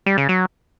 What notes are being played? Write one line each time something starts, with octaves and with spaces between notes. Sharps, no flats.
G3
C#3
F#3